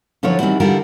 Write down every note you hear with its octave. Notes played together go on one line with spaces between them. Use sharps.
D3 F3 F#3 E4 B4 C#5
D#3 E3 G3 C4 E4 F#4
D3 E3 G3 F4 F#4 A#4